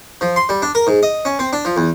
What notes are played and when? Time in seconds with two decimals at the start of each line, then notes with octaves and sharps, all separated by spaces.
0.21 F3
0.36 C6
0.49 G3
0.62 D4
0.75 A#4
0.87 G#2
1.03 D#5
1.25 C#4
1.39 C4
1.53 D4
1.65 F3
1.77 E2